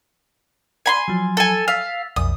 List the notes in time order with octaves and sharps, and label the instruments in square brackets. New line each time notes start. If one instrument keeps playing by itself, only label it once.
[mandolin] G#5 B5 C6
[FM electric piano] F3 F#3
[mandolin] A4 G#5
[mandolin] F5 [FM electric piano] E6 A6 B6
[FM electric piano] B1 F2 [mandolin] D#6